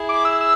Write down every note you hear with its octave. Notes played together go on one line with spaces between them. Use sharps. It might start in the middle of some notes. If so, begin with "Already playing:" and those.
Already playing: E4 G#4
D6
E6
E6